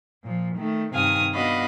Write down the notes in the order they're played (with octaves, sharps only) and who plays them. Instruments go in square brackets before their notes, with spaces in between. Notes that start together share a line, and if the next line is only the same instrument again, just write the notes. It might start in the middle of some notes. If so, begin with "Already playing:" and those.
[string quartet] A#2 F3
D#3 A3
G2 C3 D#3 F5 G#5 D#6
B3 D4 F#4 D#5 F5 B5